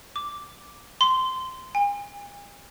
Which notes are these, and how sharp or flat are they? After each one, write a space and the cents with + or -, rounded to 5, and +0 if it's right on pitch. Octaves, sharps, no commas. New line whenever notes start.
D6 -5
C6 -15
G#5 -40